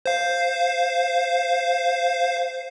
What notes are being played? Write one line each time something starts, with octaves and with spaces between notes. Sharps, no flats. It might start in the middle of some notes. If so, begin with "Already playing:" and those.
C5 F5